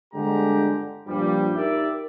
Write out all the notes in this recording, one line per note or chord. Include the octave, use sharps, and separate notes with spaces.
G1 D3 G#3 G4 A#5
G2 A#2 F3 G3
D#4 G4 A#4 D5 E5